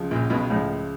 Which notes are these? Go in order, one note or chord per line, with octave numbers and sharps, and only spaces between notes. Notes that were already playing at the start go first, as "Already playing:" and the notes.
Already playing: C#2 C#3 F3
A#1 A#2
B1 B2
C#2 A2 C#3 F3